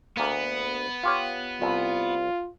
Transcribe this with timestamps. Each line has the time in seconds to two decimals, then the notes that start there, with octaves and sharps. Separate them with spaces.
0.17 D2 A#3 B3
1.03 F4 G4 C#5
1.62 C2 E4 F4